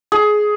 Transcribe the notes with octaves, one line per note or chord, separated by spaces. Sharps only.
G#4